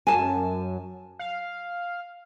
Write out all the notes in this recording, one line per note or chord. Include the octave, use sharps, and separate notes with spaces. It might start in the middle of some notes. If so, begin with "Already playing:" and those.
F#2 G#5 A5
F5